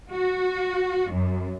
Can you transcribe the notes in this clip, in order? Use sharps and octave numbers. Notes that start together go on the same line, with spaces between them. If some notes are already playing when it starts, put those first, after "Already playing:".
F#4
F#2